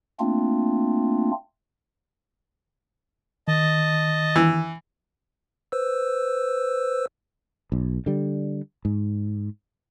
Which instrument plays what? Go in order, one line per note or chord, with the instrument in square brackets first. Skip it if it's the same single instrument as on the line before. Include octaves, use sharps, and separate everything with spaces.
[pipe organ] A3 A#3 C4 D4 F4
[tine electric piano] D#3 [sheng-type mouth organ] D#5 A5
[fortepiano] E3
[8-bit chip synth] B4 C5 E6
[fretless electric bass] B1
D3 G3
G#2